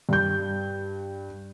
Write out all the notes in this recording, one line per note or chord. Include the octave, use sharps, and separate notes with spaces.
G2 G6